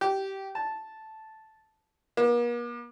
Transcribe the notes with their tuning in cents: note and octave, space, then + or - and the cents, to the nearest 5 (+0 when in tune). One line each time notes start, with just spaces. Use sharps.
G4 -15
A5 -5
A#3 +45